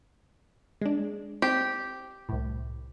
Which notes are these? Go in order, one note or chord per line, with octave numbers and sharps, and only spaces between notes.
G#3 D4
C4 G4
C2 A2